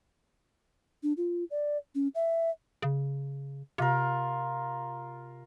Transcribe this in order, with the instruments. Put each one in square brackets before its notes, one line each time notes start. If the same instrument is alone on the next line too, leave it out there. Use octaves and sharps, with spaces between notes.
[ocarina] D4
F4
D5
C#4
E5
[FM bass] C#3
[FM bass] C3 [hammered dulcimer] F4 A#4